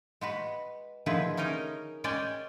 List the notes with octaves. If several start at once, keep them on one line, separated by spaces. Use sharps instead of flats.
G#3 F#4 B4
D3 D#3 F3 E4 G#4 B4
C#4 D#4 A#4 D#5
G#3 C#4 D5 G5 G#5